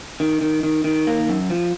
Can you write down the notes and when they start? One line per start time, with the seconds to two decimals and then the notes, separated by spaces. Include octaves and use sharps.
0.20 D#3
0.41 D#3
0.63 D#3
0.84 D#3
1.07 A#3
1.29 F#2
1.50 F3